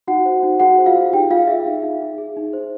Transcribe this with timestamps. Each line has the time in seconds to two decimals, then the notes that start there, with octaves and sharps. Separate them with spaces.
0.08 D#4 F#4 F#5
0.25 C5
0.43 D#4
0.60 F#4 G#4 F#5
0.78 C5
0.86 F4 F5
0.96 G#4
1.12 D#4 G4 G5
1.30 F4 G#4 F5
1.48 G#4 E5
1.66 D#4
1.83 D#4
2.02 G#4
2.18 G#4
2.37 D#4
2.53 C5